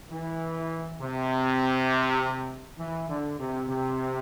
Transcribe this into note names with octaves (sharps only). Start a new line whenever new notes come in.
E3
C3
E3
D3
C3
C3